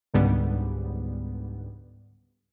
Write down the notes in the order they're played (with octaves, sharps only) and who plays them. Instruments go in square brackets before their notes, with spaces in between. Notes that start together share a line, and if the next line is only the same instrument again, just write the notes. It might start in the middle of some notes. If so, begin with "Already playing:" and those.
[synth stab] C#2 G#2 D3 G3 B3